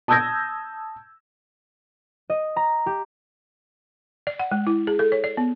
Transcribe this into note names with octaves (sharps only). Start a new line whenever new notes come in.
A5 D#6 E6 G6 G#6 A#6
D#5
A#5
G4
D5
F#5
G#3
E4
G#4
A4
C#5
D5
B3